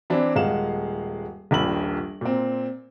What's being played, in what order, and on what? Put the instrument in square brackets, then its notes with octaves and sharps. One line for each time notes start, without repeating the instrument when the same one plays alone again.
[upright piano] E3 C4 D4 E4
D#1 G#3 F5 F#5 E7
D#1 A#1 B5 F#7
A#2 C4